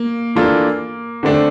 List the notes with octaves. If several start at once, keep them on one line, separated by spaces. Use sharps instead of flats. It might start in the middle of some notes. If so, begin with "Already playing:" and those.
Already playing: A#3
E3 A#3 D4 F4 A4
D3 A3 C4 D4 A4